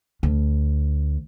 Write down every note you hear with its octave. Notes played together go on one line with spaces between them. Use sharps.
D2